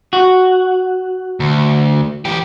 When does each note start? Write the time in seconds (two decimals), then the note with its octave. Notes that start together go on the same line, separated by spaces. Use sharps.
0.13 F#4
1.40 D2
2.25 E3 G4